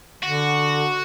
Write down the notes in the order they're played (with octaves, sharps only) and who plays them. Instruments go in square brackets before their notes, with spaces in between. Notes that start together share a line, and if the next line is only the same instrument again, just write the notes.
[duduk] D3 [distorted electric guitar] F#4